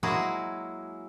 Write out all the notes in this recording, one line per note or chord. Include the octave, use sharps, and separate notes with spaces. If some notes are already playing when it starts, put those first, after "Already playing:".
F#3 G#3 A#3 E4 F#4 G#4